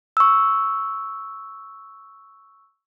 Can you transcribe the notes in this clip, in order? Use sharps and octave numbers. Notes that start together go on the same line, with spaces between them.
C#6 E6